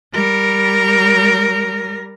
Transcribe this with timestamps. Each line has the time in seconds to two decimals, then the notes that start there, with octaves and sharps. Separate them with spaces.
0.14 G3 A#4